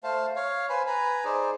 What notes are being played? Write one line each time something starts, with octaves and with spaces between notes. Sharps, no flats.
A3 C5 F5 A5
C#5 F5
B4 C5 G#5 B5
B4 G#5 A#5 B5
D#4 G#4 C5 D5